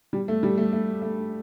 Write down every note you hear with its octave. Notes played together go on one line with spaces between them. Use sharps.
G3
A3
G3
A3
A3
A3